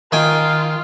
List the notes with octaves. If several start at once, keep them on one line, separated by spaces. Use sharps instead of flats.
D#3 F4 G5 G#5